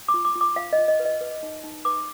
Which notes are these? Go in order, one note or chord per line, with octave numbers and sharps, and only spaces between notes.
D6
F4
D6
F4
D6
F4 F5
D#5
F4
D#5
B4
D#5
B4
D#4
D#4
B4 D6